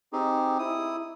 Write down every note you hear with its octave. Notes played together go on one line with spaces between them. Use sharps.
C4 D#4 G4 G#4
E4 D#6